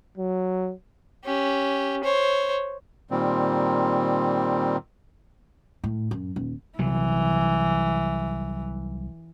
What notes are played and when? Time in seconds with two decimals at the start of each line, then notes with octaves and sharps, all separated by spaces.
0.18 F#3
1.25 C#4 G4
2.04 C5 C#5
3.11 A#2 D#3 G3 C4
5.84 A2
6.11 F#2
6.36 D#1
6.79 C2 E3 F#3